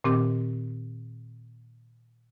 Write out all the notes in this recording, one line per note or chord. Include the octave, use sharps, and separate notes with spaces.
A#2 D#3 C4 G4 D6